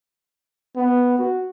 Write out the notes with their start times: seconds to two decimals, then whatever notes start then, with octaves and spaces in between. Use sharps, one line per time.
0.76 B3
1.18 F#4